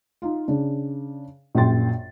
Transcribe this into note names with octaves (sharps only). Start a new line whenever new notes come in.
D#4 F4
C#3 D4
A#1 F#2 A#2 G5 C6 A6